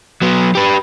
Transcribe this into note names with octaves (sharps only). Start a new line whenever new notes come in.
F#3 B3
G4 B4